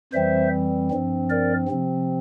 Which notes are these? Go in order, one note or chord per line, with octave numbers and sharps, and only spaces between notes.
F2 E3 G3 C4 C5 E5
G2 F3 C4
A#4 D5
C3 F3 C4